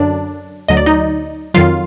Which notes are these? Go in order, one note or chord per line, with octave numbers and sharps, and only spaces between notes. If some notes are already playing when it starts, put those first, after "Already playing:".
Already playing: F#2 D3 F#3 D4 D5
D2 D3 F#3 D#5
D5
D#4 D#5
F2 D#3 F#3 F4 F5